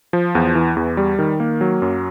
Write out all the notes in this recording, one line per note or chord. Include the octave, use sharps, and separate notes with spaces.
F3
E2
E3
E2
G3
D#3
A#3
F#3
F#2